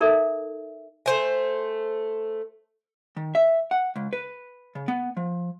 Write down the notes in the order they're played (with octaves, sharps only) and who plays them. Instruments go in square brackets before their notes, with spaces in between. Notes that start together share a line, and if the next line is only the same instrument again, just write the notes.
[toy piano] D#4 A4 A#4 D5 E5
[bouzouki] A3 C5 G#5
[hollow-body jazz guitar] D#3
E5
F#5
C#2
B4
C#3
B3
F3